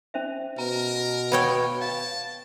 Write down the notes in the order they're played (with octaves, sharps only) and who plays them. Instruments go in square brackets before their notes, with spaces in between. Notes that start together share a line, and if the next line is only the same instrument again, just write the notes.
[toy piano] C#4 C5 E5
[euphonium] B2 [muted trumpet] A#4 [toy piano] A#5
[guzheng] B3 C#5 G5 [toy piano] F5
[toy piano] F5 [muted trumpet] A5